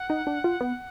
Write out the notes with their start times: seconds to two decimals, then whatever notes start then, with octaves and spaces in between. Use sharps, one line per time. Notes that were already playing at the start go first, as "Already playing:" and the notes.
Already playing: F#5
0.10 D#4
0.27 D4
0.44 F4
0.61 B3